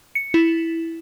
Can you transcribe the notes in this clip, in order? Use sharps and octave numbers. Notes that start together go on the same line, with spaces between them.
C#7
E4